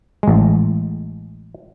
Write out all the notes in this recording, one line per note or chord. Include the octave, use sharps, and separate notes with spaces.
A1 G#3